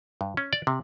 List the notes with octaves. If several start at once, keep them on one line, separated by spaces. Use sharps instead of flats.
G2
C#4
D5
C3